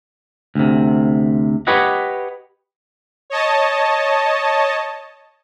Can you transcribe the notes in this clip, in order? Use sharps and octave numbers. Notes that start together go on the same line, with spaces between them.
D2 C3
G4 B4 C#5 D#5 F#5
C#5 D#5 A5